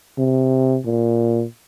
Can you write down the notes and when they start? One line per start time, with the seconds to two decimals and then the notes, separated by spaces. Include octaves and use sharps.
0.18 C3
0.85 A#2